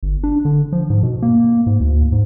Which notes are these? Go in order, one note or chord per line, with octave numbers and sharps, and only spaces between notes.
G1
D4
D3
F3
G#2
B2
A#3
G#2
D2
G#2